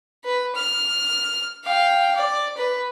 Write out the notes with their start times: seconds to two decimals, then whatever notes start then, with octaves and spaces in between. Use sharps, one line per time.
0.24 B4
0.55 F6
1.64 F5 G5
2.16 D5
2.57 B4